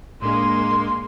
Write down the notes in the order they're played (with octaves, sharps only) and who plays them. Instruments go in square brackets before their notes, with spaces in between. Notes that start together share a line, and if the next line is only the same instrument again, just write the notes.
[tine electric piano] A2 D4 [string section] G#3 A#3 [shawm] C6